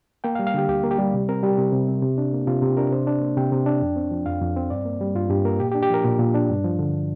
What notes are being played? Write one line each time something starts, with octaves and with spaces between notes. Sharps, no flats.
A#3 G5
F5
G3
F5
D3 G4
D2 G4
A#3
G4
G3
C3
C4 A#4
G3 G4
C3
C3
C4
C3
D4
A#3
C3 F4
C3 G4
D4 A#4
C3 C5
D4
A#3
C3 G5
C3
D4
F2
C4
F3
F2 F5
F2
C4
G2 D5
A#3
G3
G2 F4
G2 G4
A#3 A#4
A#2 G4
G4
D4
G4
F3 A#4
A#2
A#2
D4
G2
F3
D3